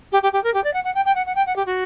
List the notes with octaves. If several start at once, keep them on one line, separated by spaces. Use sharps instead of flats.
G4
G4
G4
A#4
G4
D5
F#5
F#5
G5
G5
F#5
F#5
G5
F#5
G4
F#4